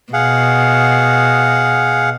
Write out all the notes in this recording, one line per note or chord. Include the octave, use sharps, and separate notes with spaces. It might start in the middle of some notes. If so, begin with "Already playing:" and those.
B2 G#4 F5 F#5